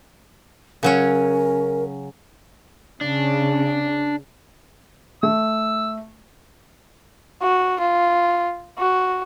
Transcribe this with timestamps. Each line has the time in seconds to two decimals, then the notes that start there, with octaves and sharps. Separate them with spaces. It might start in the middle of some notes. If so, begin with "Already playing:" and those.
0.83 C#3 F#3 C#4 A#4
3.01 C#3 D4
5.23 A3 E6
7.41 F#4
7.80 F4
8.79 F#4